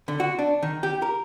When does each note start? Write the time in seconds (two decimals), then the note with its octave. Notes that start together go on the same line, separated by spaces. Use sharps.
0.08 D3
0.20 F#4
0.39 D4
0.63 D#3
0.83 G4
1.02 A#4